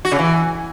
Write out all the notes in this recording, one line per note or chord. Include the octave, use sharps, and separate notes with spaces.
F#4
C#3
E3